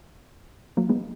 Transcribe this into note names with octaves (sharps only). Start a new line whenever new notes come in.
F#3 A#3
G#3 B3